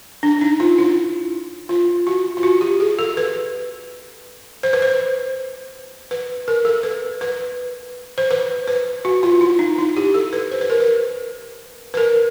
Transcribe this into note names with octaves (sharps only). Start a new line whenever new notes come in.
D4
D#4
F4
E4
F4
F#4
F4
F#4
G4
G#4
A4
B4
C5
B4
C5
B4
A#4
A4
B4
B4
C5
B4
B4
F#4
F4
E4
D#4
E4
G4
A4
B4
C5
B4
A#4
B4
B4
A#4